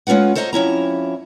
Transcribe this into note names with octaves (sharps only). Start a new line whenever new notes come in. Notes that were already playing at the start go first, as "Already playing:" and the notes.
G#3 C#4 F4 B4 F#5
A4 C5 C#5 D#5 A#5
F2 C#4 E4 A#5